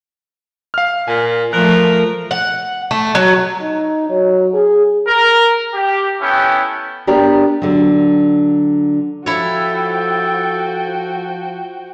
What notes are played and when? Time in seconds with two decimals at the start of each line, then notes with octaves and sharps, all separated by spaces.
0.74 F5 F6
1.08 A#2 G#5
1.53 F3 A3 A#4 F#6
2.31 F#5
2.91 A3
3.15 F#3
3.61 D#4
4.10 F#3
4.54 G#4
5.07 A#4
5.74 G4
6.21 B3 C#4 E4 A4 G5
7.07 B3 D4 G4 A#4
7.62 D3 F#3
9.26 F3 E4 F#4 A4 C#5 G5